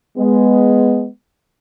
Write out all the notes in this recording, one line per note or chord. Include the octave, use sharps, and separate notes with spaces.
G#3 B3